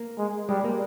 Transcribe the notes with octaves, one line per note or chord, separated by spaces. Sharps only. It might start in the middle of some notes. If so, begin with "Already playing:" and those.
Already playing: A#3
G#3
G3 G#3
A#3